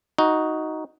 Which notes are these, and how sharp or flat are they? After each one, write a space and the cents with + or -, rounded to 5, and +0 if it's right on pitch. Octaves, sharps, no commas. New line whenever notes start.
D#4 +5 F#4 +0